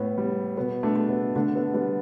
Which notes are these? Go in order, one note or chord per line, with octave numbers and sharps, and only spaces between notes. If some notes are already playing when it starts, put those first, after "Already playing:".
Already playing: A2 B3
G3
B2 B3
A3 D4
A3
B3
D3 A3 D4
B3
G3 B3